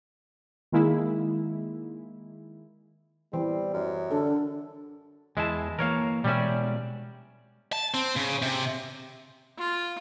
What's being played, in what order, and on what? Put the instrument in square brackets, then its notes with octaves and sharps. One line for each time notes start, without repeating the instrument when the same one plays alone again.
[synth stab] D#3 G#3 A#3 E4
[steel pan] E3 [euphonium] G3 [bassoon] C4
[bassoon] F#2
[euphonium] D3 [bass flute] D4 [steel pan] A4
[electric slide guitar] E2 A5 [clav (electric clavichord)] G#3 E4
[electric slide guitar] E3 A#3 [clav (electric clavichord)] A#4 C#5 F5
[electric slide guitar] B2 G#3 D5 [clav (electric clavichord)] G3 C#4 E5
[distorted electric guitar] A5
C4
C#3
C3
[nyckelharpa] F4